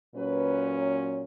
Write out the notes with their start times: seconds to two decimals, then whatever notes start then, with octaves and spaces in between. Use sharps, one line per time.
0.15 A#2 F#3 C#4 B4